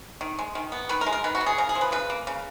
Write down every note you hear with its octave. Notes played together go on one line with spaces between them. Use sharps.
D#3
G#3
D#3
B3
D#3 B4
A#4
G#3
A#4
D#3 B4
F#4
B3
G#4
C#3 A#4
G#4
F3
B4
C#3 B4
A#3
C#3